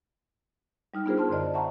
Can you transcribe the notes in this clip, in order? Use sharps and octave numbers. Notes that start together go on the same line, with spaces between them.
G3 D#4 F6
B3 D4 F4 G#4 A#4 C5
A5 C6 F6
F#2 D3 C5 D5 D#5
D5 E5 F#5 A5 A#5 C#6